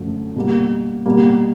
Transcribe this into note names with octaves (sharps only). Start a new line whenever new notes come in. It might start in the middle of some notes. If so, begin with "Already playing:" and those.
Already playing: F#2 D3 F3 A3
B2 G3 A#3
B2 G3 A#3